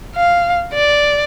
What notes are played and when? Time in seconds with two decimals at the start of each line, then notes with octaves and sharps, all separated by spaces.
0.16 F5
0.74 D5